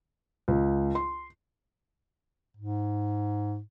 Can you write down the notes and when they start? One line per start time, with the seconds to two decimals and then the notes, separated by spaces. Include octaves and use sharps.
0.48 C#2
0.95 C6
2.57 G#2